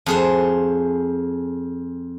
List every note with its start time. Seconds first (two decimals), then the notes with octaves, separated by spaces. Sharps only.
0.06 F2 G#4 C5